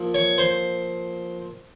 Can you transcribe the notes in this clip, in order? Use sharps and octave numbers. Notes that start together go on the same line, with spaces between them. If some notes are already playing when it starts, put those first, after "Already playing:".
Already playing: A#2 F3
C#5
C5